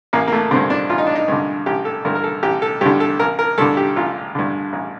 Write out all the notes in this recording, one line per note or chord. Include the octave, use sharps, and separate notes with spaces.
A1 A#3
A#3
A3
G2 D3 C4
D4
A1 F4
D#4
D4
D#4
G2 D3
A1 G4
A4
G2 D3 A#4
A#4
A4
A1 G4
A4
G2 D3 G4
A4
A1 A#4
A#4
G2 D3 A4
G4
A1 F4
G2 D3
A1